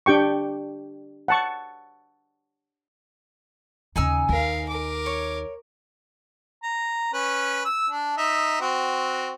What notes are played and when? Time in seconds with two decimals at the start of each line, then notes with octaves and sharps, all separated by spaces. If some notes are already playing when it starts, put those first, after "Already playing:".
0.06 D4 G4 G5 C#6
1.28 F#5 A5 C#6
3.96 D#2 C#3 D#4 G#5 E6
4.29 D#2 A#4 F5
4.68 A#4 D6
5.06 C#5
6.63 A#5
7.13 C#4 B4
7.65 E6
7.90 D4
8.17 D#4 E5
8.61 C4 F#4